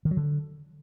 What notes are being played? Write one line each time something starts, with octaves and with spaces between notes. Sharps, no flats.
D#3
F#3
D3